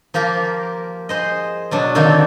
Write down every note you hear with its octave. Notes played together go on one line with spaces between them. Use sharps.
F3 A#3 G4 A#4
G#4 C5 D#5
B2 F#3 D4
D3 D#3 F#3 A#3 C4 D4